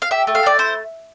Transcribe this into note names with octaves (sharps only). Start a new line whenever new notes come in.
F5
G4 E5
A3
F5
A3 D5
E4 C5